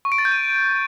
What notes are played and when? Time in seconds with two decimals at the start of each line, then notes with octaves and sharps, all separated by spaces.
0.05 C#6
0.12 D7
0.18 A6
0.25 G6
0.32 D#7